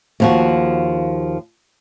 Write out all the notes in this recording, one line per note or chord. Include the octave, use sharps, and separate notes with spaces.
D#2 F3 F#4